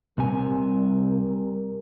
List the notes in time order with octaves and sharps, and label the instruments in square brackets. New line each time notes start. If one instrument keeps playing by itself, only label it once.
[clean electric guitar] C2 C3 G#5 [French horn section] G3 A#4